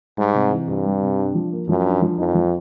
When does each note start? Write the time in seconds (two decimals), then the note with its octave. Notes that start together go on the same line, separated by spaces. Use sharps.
0.17 G#2 G3
0.34 C3
0.51 E3
0.68 G2 C3
0.85 G3
1.02 C3
1.19 D4
1.35 F3
1.52 A#3
1.69 F#2 F3
1.86 D4
2.02 F3
2.18 F2 D#4
2.35 F3